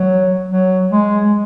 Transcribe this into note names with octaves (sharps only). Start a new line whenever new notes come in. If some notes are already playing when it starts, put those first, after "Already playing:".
Already playing: F#3
F#3
G#3